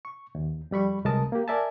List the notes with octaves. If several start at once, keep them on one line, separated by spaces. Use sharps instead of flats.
C#6
D#2
F2 G3 B5 C#6
C2 G#3 A#4 A5 D#6
A#3 G4
A#4 D5 E5 G#5 A5